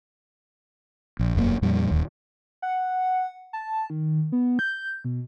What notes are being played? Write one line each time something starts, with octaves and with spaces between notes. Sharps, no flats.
A#1
E1 F#2 C#3 A#3
F2 A#2 G3
D1 D#2
F#5
A5
D#3
B3
G6
B2